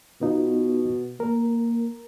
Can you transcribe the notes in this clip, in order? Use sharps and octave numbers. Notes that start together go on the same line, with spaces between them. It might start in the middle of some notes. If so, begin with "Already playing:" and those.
B2 B3 D#4 F4
A#3 A#4